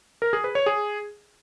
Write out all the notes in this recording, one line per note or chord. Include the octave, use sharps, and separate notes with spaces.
A#4
G#4
B4
C#5
G#4